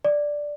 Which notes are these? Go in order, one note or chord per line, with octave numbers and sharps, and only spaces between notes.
D5